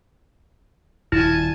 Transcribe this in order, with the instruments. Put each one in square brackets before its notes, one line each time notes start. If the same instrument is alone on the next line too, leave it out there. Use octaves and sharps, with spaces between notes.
[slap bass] D#1 [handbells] E4 [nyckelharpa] G#5 A5